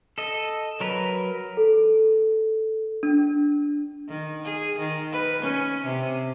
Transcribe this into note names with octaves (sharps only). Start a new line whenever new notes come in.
A4 D#5
F#3 A#4 B4
A4
D4
D#3
G#4
D#3
B4
C#4
C3